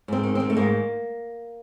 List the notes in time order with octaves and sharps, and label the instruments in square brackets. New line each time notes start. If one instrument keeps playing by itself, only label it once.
[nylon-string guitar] G#2 C4
D#3
D#3 C4
A3
G#2 A#3